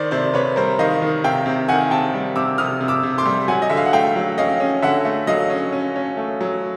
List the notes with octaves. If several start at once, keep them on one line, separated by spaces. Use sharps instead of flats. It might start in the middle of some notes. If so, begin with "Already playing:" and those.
Already playing: D#3 C5 D5
C3 C5 D5
C3 B4 C#5
G3 A#4 C5
D#3 D#5 F5
D#3
C3 F5 G5
C3
D#3 F#5 G#5
C3 G5 A5
G3
C3 D6 E6
C3 D#6 F6
C3
D6 E6
C3
C6 D6
G3
F#3 F#5 G#5
D#5
D3 E5
F5
F#5
A3 F5 G5
F#3
C#4 D#5 F5
C#4
D3 E5 F#5
A3
F#3 D#5 F5
C#4
C#4
C#4
A3
F#3